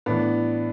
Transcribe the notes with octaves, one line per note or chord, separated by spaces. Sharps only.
A2 E3 B3 D4